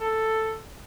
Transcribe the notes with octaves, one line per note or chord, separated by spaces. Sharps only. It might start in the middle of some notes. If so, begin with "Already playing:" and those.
A4